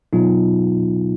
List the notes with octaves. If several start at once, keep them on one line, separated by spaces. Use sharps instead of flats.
B2 F#3 B3 D#4 F4